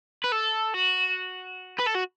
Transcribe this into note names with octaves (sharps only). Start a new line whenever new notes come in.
B4
A4
F#4
B4
A4
F#4